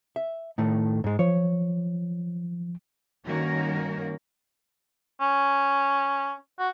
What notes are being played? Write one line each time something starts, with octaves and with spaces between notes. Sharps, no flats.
E5
A2 D#3 A3
G#2 G#3
F3 C#5
G2 D#3 A#3 C#4 F#4 A#4
C#4
F#4